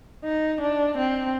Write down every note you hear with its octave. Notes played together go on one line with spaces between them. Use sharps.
D#4
D4
C4